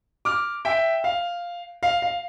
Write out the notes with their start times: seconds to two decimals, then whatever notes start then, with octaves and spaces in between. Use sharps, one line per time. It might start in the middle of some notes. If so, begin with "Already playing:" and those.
0.25 D6 F6
0.65 E5 G5
1.04 F5
1.83 F5
2.02 F5